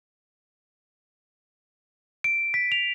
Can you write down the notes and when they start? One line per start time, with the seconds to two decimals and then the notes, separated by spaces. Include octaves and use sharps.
2.24 D7
2.54 B6
2.72 F7